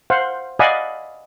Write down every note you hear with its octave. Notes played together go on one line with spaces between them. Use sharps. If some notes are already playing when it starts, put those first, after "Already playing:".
C5 F5 F#5
D5 D#5 F5 F#5 G#5 B5